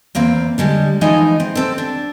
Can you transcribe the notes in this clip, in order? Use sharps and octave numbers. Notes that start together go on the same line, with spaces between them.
E2 A#3 C4 F5
D3 G3 G#3
E3 F3 G#3 D#4 D#5 G#5
C4
C4 A4
D4